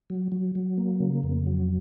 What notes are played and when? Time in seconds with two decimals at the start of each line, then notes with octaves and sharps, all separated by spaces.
0.10 F#3
0.32 F#3
0.55 F#3
0.78 A#3
1.00 C#3
1.23 F2
1.46 F#3